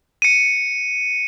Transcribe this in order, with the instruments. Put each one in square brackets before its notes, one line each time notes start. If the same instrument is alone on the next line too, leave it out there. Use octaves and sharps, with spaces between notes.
[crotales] C#7 D#7